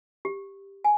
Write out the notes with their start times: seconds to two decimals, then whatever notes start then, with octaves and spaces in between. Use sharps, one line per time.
0.25 G4
0.84 G#5